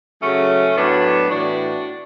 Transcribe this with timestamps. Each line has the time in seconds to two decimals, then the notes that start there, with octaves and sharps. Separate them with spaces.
0.21 C#3 F#3 A3 C#4
0.75 A2 F#3 B3 D4
1.29 A2 E3 D4 F#4